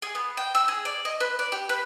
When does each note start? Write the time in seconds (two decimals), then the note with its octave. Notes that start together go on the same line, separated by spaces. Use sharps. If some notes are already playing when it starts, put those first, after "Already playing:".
0.02 G#4
0.15 B3
0.37 G5
0.55 E6
0.68 G#4
0.85 D5
1.05 D#5
1.20 B4
1.39 D5
1.52 G4
1.69 B4